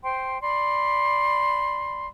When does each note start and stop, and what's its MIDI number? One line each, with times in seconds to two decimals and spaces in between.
0.03 0.41 72
0.03 0.41 79
0.03 0.41 84
0.42 2.07 74
0.42 2.07 83
0.42 2.07 84